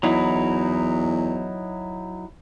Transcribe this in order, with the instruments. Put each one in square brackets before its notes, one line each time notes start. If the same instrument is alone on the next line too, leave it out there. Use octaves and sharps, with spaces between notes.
[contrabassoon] E2 [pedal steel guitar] F#3 D#4 E4